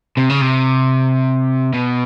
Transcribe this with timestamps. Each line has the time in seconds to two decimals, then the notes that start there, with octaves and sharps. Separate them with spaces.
0.17 C3
0.30 C#3
0.41 C3
1.73 B2